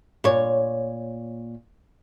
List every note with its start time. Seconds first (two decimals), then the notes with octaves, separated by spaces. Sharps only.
0.24 A#2 C#5